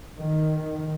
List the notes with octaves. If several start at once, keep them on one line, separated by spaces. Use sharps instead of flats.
D#3